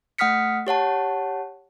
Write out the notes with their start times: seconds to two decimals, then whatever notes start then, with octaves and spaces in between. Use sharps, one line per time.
0.18 A3 F#5 D#6 F6 B6 C#7
0.67 G4 C#5 F#5 A5